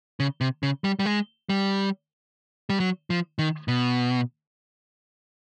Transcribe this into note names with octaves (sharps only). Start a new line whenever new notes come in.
C#3
C3
C#3
G3
G3
G#3
G3
G3
F#3
F3
D#3
B2